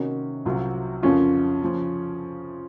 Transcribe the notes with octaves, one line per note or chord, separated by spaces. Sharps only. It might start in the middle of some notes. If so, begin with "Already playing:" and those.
Already playing: C3 D#3 A#3 C#4 D#4 F#4
C2 C3 F#3 C4 F4
F2 C#3 F3 A#3 C#4 F4
C#3 F3